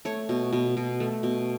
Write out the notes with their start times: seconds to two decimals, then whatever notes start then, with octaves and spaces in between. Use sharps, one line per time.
0.05 A3 C#5
0.29 B2
0.53 B2
0.77 B2
1.00 A3
1.23 B2